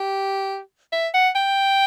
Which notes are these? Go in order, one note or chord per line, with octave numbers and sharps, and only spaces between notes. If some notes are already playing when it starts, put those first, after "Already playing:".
Already playing: G4
E5
F#5
G5